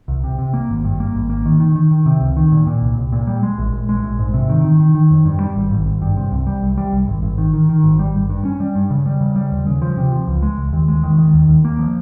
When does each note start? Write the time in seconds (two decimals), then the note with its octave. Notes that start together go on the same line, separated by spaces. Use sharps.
0.08 C2
0.24 C3
0.39 C3
0.54 A#3
0.69 G#1
0.84 G2
1.00 A#3
1.15 G#1
1.30 A#3
1.46 D#3
1.60 D#3
1.76 D#3
1.91 D#3
2.06 C3
2.21 C#2
2.37 D#3
2.52 A#2
2.67 A#2
2.82 C2
2.97 C2
3.12 A#2
3.27 G3
3.43 G#3
3.58 A#1
3.73 A#1
3.89 G#3
4.03 A#1
4.19 G#2
4.34 C3
4.49 D#3
4.64 D#3
4.80 D#3
4.95 D#3
5.11 F2
5.25 G2
5.40 G3
5.56 G#1
5.71 G#1
5.86 G#1
6.02 G2
6.17 C3
6.32 C2
6.47 G3
6.62 C2
6.77 G3
6.93 C2
7.08 G#1
7.23 G#1
7.38 D#3
7.54 D#3
7.69 D#3
7.84 G#1
7.99 G3
8.15 G#1
8.30 G2
8.45 C#4
8.60 G3
8.75 G2
8.90 C#3
9.06 G3
9.21 C#3
9.36 G3
9.51 D#2
9.67 C#3
9.82 F3
9.97 C3
10.12 F3
10.28 C#2
10.42 G#3
10.58 C#2
10.73 D#2
10.88 G#3
11.03 D#3
11.18 D#3
11.34 D#2
11.49 D#2
11.65 A#3
11.79 F3